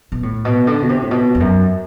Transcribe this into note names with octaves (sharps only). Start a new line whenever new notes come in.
B2
A2
B2
D3
B2
C3
A2
B2
E2
F#2